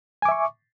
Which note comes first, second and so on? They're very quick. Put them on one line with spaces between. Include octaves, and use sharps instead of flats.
G#5 D6 E5 C#6